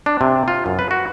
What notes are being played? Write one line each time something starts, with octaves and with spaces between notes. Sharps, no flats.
D4
C3
F4
F#2
B4
F#4